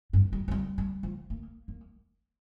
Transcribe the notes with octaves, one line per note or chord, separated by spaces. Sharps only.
G2
G3
F3
G3
G3
F3
A#3
A#3